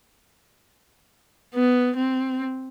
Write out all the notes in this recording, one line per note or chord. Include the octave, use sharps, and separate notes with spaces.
B3
C4